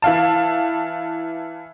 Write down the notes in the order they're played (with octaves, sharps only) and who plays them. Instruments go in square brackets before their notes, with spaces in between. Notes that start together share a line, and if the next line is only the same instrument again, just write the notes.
[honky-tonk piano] E3 E4 F5 A5